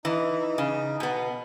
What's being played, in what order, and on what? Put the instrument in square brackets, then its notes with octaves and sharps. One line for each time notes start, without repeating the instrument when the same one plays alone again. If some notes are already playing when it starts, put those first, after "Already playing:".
[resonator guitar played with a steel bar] E3 [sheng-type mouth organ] D#4
[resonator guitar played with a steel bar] C#3
B2 B3